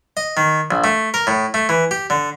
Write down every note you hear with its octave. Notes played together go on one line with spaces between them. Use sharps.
D#5
D#3
A#1
A3
A#4
A2
A3
E3
G4
D3